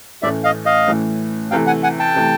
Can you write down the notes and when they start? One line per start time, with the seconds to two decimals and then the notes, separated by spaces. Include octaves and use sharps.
0.22 A2 E3 A3 C#4 D5 E5
0.44 D#5 F5
0.66 D#5 F5
0.88 A2 E3 A3 C#4
1.51 C3 E3 A3 F5 G5
1.67 F#5 G#5
1.83 F#5 G#5
1.99 G5 A5
2.15 C3 E3 A3